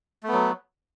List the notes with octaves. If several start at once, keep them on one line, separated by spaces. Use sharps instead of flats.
F#3 A3 B3